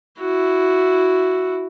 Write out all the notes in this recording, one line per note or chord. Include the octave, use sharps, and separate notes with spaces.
E4 F#4